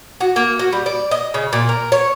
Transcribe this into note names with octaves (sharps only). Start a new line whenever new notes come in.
F#4
A#3
F#4
G3
D5
D#5
C#3
A#2
A#4
C#5